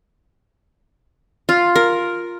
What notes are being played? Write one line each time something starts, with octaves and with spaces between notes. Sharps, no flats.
F4
A#4